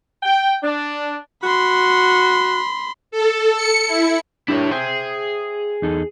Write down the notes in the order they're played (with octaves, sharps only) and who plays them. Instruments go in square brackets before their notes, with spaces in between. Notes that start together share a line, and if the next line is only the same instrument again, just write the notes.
[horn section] G5
D4
[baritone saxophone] F#4 [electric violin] B5 C6
[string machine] A4
C#7
E4
[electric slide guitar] D4 G4 A#4 [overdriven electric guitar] E4 C#5
[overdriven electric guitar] G#4 [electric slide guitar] C5 E5 G5
[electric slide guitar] E2 D#4 A4